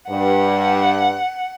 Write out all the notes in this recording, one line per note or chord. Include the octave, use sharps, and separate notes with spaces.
G2 F#5